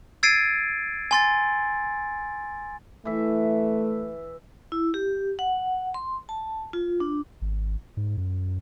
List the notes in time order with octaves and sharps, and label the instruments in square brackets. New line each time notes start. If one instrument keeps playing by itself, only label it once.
[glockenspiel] E6 G#6 A6 C7 D7 D#7
G#5 C6 A6
[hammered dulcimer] E3 E5 [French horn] A3
[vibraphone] E4
G4
F#5
C6
A5
F4
D4
[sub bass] G#1
G#2
F#2